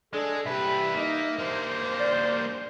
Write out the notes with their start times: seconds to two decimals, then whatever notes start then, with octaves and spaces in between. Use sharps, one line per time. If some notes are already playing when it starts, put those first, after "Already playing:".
0.13 G#3 D4 A4
0.45 C2 G4 B4 E5
0.94 A#3 D#4
1.39 G2 A#3 C5
2.00 D5